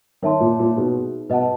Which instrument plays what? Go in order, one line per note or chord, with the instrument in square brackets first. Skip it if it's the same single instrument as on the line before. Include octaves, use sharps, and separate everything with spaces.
[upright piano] D#3 [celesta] C#5 E5 A5 C6
[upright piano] A#2
A#2
[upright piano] B2 [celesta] D#4 G#4 B4
[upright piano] B2 [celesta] B4 D#5 F#5 A5